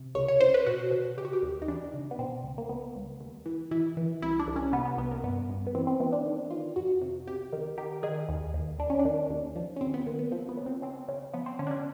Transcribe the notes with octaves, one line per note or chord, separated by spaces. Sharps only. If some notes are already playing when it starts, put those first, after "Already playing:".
Already playing: C3
C#2 C#5
C#5
C#2 C5
B4
B2 F#4
B2
C#3 G4
F#4
G4
D#2
D#4
E3 D4
C#3
B3
B2 C4
C#2
A#3
C#2 B3
C#2
D#2
E3
E3 E4
E3
C2 E4
D4
C2
C#4
C3 B3
B3
C2 B3
A#3
G2 B3
G2
B3
E3 C4
C4
E3 B3
D4
D#3
D#3 F4
F2 F#4
C3
C2 G4
D#3
D#3 G4
D#3 G#4
D#2
D#2
D#2 D4
C#4
D4
D#3
D#2
F3
C#4
D#2 C4
B3
D#2 A#3
B3
F3 C4
B3
C#3
C4
C#3 C4
C#3
F3 B3
C4
D3 C#4
D4
C#4